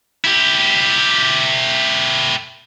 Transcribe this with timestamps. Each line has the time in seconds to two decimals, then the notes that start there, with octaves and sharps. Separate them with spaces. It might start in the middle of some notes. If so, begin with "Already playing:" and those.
0.25 E4 G4